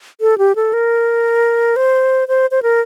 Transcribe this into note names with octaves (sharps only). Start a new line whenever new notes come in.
A4
G4
A4
A#4
C5
C5
C5
A#4